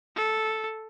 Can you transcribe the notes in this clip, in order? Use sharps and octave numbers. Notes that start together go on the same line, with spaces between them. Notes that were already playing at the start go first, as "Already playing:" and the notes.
A4